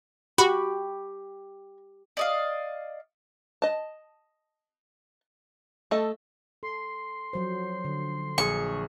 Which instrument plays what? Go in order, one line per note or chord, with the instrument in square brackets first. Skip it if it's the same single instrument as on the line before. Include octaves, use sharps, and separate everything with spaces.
[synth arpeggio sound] F#4 [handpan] G4 [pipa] B5 C#6
[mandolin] D5 D#5 F5
[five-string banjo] D#5 A5
A3 A4 D#5
[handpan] A4 [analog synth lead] C6
[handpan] F3 F#3 C5
D3
[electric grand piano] A#1 G#4 [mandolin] C#6